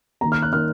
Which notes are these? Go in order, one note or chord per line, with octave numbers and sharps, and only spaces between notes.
D#3 A#3 A#5
F6
F#6
D#3 A#3 F6